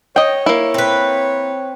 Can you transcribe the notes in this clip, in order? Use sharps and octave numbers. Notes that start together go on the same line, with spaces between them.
C#5 D#5 G5
A#3 E4
C4 B4